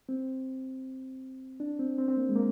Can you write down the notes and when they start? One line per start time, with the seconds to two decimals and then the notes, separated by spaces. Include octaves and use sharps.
0.09 C4
1.60 D4
1.79 C4
1.98 C4
2.08 C4
2.17 A#3
2.29 G#3
2.36 A#3